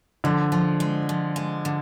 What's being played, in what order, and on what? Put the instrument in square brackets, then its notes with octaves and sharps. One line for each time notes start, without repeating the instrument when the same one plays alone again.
[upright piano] D3 [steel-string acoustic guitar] F3
[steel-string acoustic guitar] F3
G#3
F3
G#3
D3